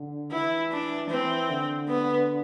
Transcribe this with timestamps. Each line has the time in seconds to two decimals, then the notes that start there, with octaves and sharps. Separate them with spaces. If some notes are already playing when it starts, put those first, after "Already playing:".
Already playing: D3
0.32 E3 E4
0.71 D4
1.10 E3 C4
1.49 D3
1.88 B3